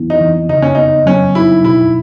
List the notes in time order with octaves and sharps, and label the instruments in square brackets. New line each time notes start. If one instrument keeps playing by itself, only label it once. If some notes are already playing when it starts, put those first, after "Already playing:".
Already playing: [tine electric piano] E3 B3 E4
[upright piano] D#4
[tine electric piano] E3
[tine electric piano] C#3 [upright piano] D#4
[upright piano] C#4
[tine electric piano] B3 [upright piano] D#4
[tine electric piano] F#3 [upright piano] C#4
[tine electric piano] D#4 [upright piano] E4
[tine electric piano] B2 [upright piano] E4